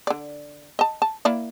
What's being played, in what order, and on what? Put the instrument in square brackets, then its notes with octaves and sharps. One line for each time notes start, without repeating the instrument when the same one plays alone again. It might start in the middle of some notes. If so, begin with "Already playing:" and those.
[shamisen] D3 D5
D#5 A5
A5
A#3 E4 D5